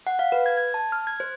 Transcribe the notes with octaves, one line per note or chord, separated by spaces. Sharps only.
F#5
F5
B4
G#6
G#6
A5
F6
G#6
C5